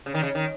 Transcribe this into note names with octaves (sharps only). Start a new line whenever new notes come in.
C#3
D#3
C#3
D#3